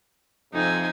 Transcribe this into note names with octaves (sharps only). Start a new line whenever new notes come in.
F2 C3 D#4 G#5